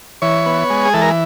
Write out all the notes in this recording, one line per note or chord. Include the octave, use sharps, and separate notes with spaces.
E3 C#5
B3
G#3
G#4
E3 A4
A#4